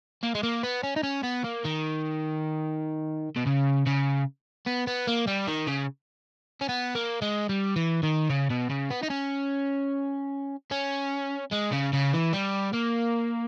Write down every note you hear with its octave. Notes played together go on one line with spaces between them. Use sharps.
A#3
G#3
A#3
B3
C#4
D#4
C#4
B3
A#3
D#3
B2
C#3
C#3
B3
B3
A#3
G3
D#3
C#3
C#4
B3
A#3
G#3
G3
E3
D#3
C#3
B2
C#3
B3
D#4
C#4
C#4
G#3
C#3
C#3
E3
G3
A#3